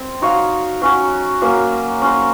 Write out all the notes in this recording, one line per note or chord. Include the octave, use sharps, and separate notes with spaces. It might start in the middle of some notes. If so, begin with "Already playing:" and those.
Already playing: C4
D#4 F#4 C#5 F5
F#3 C#4 F#4
F#3 A#3 C#4
C#4 F#4 C5